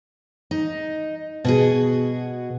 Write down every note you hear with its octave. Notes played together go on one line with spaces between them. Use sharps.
D#4
B2 F#4 G#4